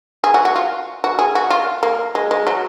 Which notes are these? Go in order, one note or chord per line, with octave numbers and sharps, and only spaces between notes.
G#4
F#4
F#4
F4
F#4
G#4
F#4
F4
A#3
G#3
G#3
F#3